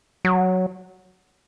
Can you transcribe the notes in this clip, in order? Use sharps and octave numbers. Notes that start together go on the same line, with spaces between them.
F#3